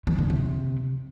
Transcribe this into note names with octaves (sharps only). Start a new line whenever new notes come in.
E3
D3
C3